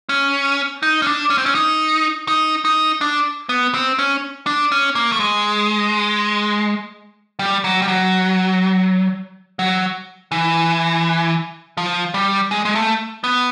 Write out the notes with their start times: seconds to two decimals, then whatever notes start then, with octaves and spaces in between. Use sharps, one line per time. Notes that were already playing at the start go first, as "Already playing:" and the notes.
0.09 C#4
0.83 D#4
1.02 C#4
1.07 D4
1.30 C#4
1.38 C4
1.46 C#4
1.55 D#4
2.28 D#4
2.65 D#4
3.01 D4
3.49 B3
3.74 C4
3.99 C#4
4.47 D4
4.72 C#4
4.95 A#3
5.12 A3
5.20 G#3
7.39 G3
7.64 F#3
7.82 G3
7.88 F#3
9.59 F#3
10.32 E3
11.77 F3
12.14 G3
12.51 G#3
12.65 G#3
12.75 A3
13.24 B3